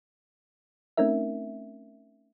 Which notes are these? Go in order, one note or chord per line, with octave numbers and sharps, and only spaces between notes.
A3 C4 C#4 D#4 A#4 E5